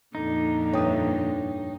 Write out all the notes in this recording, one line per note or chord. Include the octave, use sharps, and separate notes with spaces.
F2 A#2 D3 D#4
G2 C#5 E5 G5 D#6